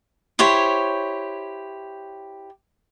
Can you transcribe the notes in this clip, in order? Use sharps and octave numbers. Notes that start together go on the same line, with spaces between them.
E4 G4 C5 C#5